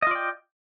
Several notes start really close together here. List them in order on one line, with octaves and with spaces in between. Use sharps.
D#5 F4 D5 G5